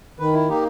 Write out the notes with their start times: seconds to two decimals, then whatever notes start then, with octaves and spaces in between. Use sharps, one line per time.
0.19 D#3 B4
0.33 E4
0.48 A#3 D#4 G4